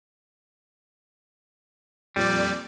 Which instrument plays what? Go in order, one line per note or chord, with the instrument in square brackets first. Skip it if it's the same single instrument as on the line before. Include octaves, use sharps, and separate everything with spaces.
[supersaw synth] F2 A#2 D5 [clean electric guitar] G3